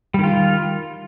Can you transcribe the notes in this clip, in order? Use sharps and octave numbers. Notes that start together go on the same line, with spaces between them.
D#3 G3 F4